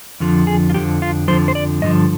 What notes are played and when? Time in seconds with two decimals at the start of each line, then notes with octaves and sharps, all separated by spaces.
0.20 F2 D3 F3
0.47 G#4
0.70 F4
0.74 F2 D3 F3 G4
1.02 F4
1.28 F2 D3 F3 C5
1.48 C5
1.55 D5
1.82 G2 D3 F3 D#5